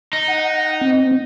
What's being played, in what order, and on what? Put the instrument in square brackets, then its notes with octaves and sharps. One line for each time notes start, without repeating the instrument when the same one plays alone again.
[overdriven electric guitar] D#4
[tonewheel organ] F#5
C4